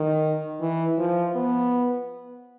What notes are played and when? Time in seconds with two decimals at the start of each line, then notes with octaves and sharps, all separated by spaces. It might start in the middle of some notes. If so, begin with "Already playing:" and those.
Already playing: D#3
0.61 E3
0.98 F3
1.36 B3